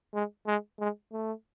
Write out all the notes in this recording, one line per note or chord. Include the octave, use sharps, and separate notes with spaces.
G#3
G#3
G#3
A3